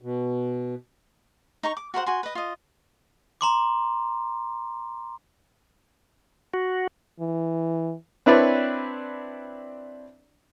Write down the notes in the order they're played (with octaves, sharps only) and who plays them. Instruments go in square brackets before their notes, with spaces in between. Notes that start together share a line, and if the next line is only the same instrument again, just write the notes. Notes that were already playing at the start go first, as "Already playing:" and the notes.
[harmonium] B2
[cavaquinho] D#4 A#5 C#6
D6
F#4 A#4 C5 F#5
F#4 G#5 C6
B4 D#5
F4 D#5
[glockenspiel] A#5 C6 D6
[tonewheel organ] F#4
[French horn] E3
[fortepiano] C4 D4 E4 B4 C#5 D5